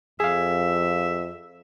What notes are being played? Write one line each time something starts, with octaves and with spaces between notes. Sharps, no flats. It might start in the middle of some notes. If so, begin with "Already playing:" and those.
F2 G#4 E5 F5